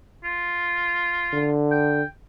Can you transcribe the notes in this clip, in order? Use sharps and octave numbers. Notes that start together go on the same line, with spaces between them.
F4
D3
G5